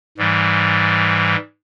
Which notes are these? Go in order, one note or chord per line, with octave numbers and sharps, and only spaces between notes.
G#2 E3 G3